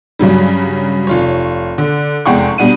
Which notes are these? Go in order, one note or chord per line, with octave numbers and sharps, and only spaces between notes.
G2 C#3 F#3 G3
F1 F4 C#5
D3
F1 E2 G#3 F#5 G5 C#6
B2 G3 D4 F#5 D#7